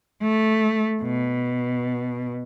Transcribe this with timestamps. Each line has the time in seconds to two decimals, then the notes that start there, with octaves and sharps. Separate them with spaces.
0.22 A3
1.02 B2